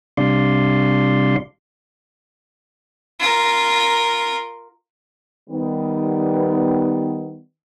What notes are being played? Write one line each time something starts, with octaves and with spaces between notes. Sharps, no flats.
C3 G3 D4 D5 F5 C6
F4 A#4
D#3 G3 B3